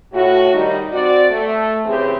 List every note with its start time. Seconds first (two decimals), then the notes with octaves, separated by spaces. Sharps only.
0.13 A2 F#4
0.53 D#3 G3 D#4
0.91 C4 F#4 D5
1.31 A3
1.86 C#3 E3 C4 G4 G#4